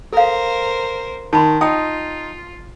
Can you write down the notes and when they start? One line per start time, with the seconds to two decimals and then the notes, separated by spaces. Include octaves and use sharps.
0.13 A4 A#4 C5 F5
1.33 D#3 A5 B5 C6
1.61 D#4 F4 G5 D#6